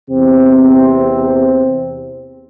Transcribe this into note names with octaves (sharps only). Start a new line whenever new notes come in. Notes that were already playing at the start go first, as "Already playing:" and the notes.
E2 C3 C4